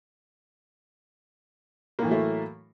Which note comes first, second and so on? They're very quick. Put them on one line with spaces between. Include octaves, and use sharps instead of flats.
A#3 A2 E3 F#3 A3